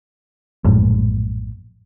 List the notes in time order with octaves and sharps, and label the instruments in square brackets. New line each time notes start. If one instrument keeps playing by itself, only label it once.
[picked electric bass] A#1 F#2 A2 G#3